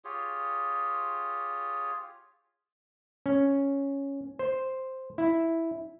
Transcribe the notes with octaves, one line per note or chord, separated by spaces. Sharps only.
F4 G4 G#4 C#5
C#4
C5
E4